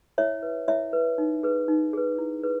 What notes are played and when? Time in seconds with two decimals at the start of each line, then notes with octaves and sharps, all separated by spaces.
0.18 E4 C#5 E5
0.43 B4
0.68 E4 C#5 E5
0.93 B4
1.18 D#4
1.43 G#4 B4
1.68 D#4
1.93 G#4 B4
2.18 E4
2.43 G#4 B4